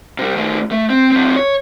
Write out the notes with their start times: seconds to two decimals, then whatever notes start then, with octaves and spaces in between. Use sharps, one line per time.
0.19 C3 G3
0.36 D#3 A3
0.71 A3
0.90 C4
1.12 F#3 C4
1.36 C#5